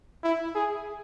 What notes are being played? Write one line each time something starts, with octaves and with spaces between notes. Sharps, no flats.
E4
G#4